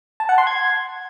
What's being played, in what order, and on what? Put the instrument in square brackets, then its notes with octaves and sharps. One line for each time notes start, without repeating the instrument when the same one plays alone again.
[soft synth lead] A5
F#5
C6
G#6